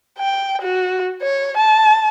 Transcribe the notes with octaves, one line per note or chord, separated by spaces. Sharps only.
G5
F#4
C#5
A5